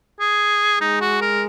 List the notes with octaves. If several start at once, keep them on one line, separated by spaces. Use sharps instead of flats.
G#4
G#3 D#4
F#4
A#4